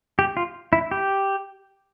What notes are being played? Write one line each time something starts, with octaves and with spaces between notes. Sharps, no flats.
G4
F4
E4
G4